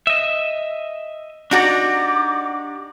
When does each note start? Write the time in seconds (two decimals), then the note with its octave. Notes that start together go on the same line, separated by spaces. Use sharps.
0.07 D#5 E5
1.51 D4 D#4 F#4 G4 D5 A#5 D6